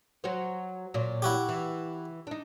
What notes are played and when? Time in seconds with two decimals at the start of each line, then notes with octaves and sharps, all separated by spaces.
0.24 F#3 F#4 C5
0.94 A#2 F#3
1.22 E4 F#4 G4
1.49 E3
2.27 D4 D#4